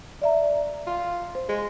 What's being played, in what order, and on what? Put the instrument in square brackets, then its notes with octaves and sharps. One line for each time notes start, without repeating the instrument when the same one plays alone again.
[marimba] D5 E5 A#5
[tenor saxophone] F4
[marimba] C5
[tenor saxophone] G#3 [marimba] C5